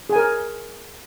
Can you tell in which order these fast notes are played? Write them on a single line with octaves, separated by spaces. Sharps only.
G#4 G#5 A#4